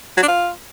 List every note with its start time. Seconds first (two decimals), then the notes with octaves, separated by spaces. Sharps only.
0.17 F#3
0.23 D4
0.28 F4